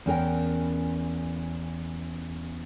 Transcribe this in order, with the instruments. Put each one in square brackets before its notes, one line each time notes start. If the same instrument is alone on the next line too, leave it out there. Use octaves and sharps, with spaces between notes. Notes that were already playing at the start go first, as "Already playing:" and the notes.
[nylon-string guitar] E2 C#4 A#4 G5